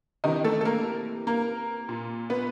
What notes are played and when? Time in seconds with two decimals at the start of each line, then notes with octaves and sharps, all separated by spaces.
0.24 C3 D#3 E3 D#4
0.44 A3 A4
0.61 A4
0.65 A#3 A#4
1.27 A#3 A#4
1.89 A#2
2.30 B3 B4